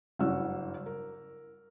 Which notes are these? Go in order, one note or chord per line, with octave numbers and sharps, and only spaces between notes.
F#1 G2 E4 F#4 F#5 E6
A#4